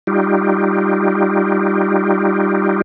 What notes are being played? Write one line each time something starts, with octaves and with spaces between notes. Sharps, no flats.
G3 D#4 F4 G4